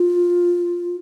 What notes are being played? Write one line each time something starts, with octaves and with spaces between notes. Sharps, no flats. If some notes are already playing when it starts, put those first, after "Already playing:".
Already playing: F4